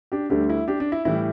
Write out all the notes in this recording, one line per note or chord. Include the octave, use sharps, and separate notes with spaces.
D4 G4
D2 D3 G3 D4 G4
E4
D4 G4
D4
E4
A2 E3 G3 E4